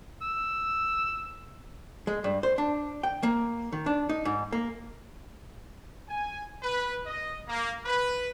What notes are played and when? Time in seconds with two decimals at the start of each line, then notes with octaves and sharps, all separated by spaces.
0.22 E6
2.07 G#3
2.24 G2
2.43 C5
2.58 D4
3.03 G5
3.23 A#3
3.72 D#3
3.86 D4
4.09 D#4
4.25 G#2
4.53 A#3
6.09 G#5
6.62 B4
7.06 D#5
7.48 A#3
7.85 B4